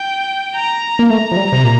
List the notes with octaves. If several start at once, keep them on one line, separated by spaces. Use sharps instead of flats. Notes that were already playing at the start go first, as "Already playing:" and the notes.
Already playing: G5
A#5
A#3
A3 A#5
F3
G3
C3
A#2